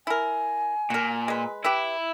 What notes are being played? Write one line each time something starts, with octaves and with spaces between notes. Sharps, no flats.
E4 A#4 G#5
A#2 F#4 A#4
G#3 B4
E4 G4 B4 E5